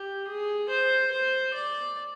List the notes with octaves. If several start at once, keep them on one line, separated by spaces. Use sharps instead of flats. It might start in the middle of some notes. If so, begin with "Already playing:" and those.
Already playing: G4
G#4
C5
C5
D5